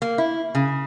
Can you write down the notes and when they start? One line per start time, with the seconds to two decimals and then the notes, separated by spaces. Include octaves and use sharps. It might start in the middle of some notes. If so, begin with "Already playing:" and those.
0.02 A#3
0.18 E4
0.55 C#3